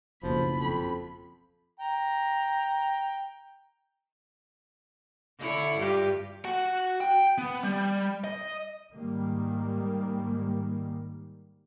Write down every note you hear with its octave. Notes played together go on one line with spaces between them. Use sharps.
F#1 B1 F3 B5
F2
G5 A#5
D3 E4 C#5
G2 F4 G4
F#4 F#5
G5
B3
G3
D#5
G#2 D#3 G3 A#3